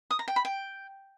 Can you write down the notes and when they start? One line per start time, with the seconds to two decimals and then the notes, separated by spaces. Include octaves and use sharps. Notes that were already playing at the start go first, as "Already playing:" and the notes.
0.11 D#6
0.19 A#5
0.28 G5
0.36 B5
0.45 G5